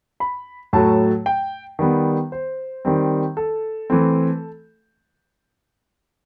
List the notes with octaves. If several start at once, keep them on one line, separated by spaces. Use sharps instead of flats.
B5
A2 F#3 A3 A5
G5
D#3 G3 B3
C5
D#3 G3 C4
A4
E3 A3 C4